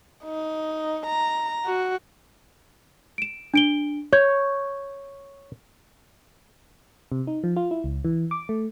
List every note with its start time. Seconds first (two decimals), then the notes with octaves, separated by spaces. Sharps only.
0.24 D#4
1.07 A#5
1.65 F#4
3.18 D7 E7
3.54 D4 D7 G7
4.13 C#5 C#6 G6 G#6
7.12 C3
7.27 D#4
7.44 F3
7.56 F4
7.71 E4
7.84 C#2
8.05 E3
8.31 D6
8.49 A3